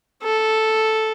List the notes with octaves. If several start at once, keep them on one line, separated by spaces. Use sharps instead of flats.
A4